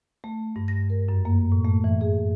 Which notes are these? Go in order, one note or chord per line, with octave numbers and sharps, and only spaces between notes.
A3
G2
A#6
A#4
F#2
A#3
A2
A3
E3
G#4